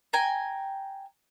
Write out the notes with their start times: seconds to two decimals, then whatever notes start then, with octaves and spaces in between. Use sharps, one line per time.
0.13 G5 G#5 A#5